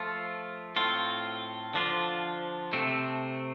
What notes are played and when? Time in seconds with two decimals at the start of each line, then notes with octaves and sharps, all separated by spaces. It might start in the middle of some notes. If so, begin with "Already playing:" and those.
Already playing: F3 A3 F4
0.76 A2 A3 C4 F4
1.74 D3 F3 D4 F4
2.73 C3 A3 C4